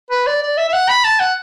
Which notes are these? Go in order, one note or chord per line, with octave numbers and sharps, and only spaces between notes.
B4
D5
D5
E5
E5
F#5
B5
A5
F#5